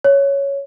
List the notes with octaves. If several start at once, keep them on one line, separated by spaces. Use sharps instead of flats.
C#5